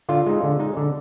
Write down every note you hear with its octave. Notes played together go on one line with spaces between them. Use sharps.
D3 F4
G#3 D#4
D3
G#3 D#4
D3